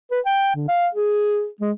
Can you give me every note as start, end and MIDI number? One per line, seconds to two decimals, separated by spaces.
0.11 0.20 71
0.26 0.54 79
0.55 0.66 50
0.68 0.87 77
0.94 1.47 68
1.60 1.72 56